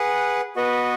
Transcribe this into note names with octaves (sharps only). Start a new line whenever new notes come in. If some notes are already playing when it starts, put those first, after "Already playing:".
Already playing: G#4 B4 F#5
B3 F#4 B4 D#5